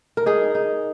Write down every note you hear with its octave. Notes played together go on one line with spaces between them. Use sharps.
A#4
D#4 G#4
D#4